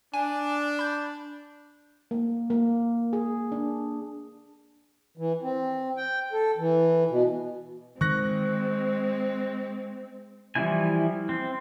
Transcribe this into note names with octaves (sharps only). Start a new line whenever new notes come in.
D4 G#5
B5 G6
A#3
A#3
G#4
D4
E3
C4
G5
A4
E3
B2
D#3 G#3 C4 C#6 F#6 A#6
E3 F3 G3 E4 G#5
C4